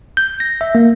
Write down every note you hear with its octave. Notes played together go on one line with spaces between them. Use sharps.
G6
A#6
E5
A#3